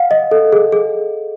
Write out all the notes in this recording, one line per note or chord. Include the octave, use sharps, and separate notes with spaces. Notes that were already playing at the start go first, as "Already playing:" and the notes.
Already playing: F5 F#5
D#5
A4
G#4
G#4